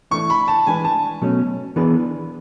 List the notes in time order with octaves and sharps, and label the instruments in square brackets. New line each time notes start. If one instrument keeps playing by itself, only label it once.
[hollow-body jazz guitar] E3 A3 D4 [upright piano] C#6
[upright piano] B5
A5
[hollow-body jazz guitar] E3 G#3 D4 G#4 B4 [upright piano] G#5
[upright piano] A5
[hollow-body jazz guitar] B2 F#3 A3 C#4
E3 B3 D4 G#4 B4